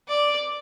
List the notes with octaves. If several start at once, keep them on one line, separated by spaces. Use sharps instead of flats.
D5